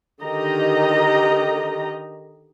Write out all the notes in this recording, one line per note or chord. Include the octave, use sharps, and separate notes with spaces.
D3 D#3 G4 D#5 A#5